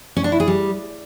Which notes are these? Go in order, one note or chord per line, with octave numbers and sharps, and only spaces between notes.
C#4
D4
E4
G#4
G3